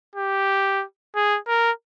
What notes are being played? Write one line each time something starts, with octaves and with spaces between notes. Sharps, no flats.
G4
G#4
A#4